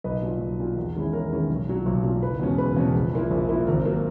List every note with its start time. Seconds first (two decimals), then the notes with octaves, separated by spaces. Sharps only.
0.04 B1 B4 D#5
0.22 A#2 F#3
0.40 B1
0.59 A#2 F#3
0.77 E2
0.95 D#3 G#3 C#4 E4
1.13 E2 A#4 C#5
1.32 D#3 G#3 C#4 E4
1.49 B1
1.68 A#2 F#3
1.86 B1
2.04 A#2 F#3
2.22 F#1 B4
2.40 E2 B2 G#3 C#4
2.58 F#1 B4
2.76 E2 B2 G#3 C#4
2.94 A#1
3.13 A#2 A#3 E4
3.31 A#1
3.49 A#2 A#3 E4
3.67 G#1 A#4
3.85 F#3 A#3